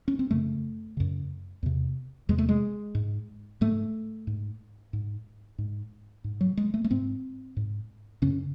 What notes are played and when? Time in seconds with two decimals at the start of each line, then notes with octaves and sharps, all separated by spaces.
0.08 C#4
0.19 C4
0.31 F#2 C#3 A3
0.97 F#2 C#3
1.63 E2 C3
2.29 E2 C3 G#3
2.38 A3
2.49 G#3
2.95 G#2
3.61 G#2 A3
4.27 G#2
4.93 G#2
5.58 G#2
6.24 G#2
6.41 F#3
6.57 G#3
6.74 A3
6.84 A3
6.91 G#2 C4
7.57 G#2
8.22 F#2 C#3 C#4